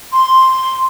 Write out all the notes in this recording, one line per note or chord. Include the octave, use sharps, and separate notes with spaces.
C6